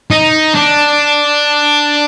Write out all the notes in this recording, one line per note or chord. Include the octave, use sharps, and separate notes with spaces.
D#4
D4